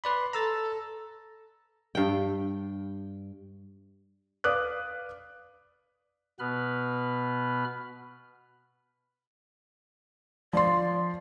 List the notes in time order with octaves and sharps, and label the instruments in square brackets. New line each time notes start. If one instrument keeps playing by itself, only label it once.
[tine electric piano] B4 D5 B5 [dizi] C6
[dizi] A4 [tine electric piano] A#5 E6 A6
[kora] G2 G5
[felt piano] B4 D5 F5 D6 D#6 F#6
[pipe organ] B2 B3 B4 B5 F6
[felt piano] F3 C6 [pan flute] D5